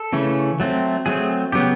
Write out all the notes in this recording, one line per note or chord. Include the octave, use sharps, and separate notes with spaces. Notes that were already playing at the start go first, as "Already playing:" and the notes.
Already playing: A4
C#3 E3 A3 C#4
F#3 A3 C4
F#3 A3 C4 G#4
C#3 F#3 B3 G4